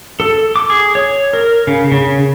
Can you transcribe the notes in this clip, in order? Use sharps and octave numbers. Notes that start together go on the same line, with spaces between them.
A4
D6
G#4
C#5
A#4
C#3
C#3